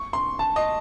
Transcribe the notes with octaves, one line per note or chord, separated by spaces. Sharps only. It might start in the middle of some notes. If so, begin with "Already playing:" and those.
Already playing: C#6
C6
A5
D#5